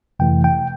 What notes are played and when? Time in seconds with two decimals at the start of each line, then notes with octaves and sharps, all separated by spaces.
0.20 F2 C3 E3 A3 G5
0.44 G5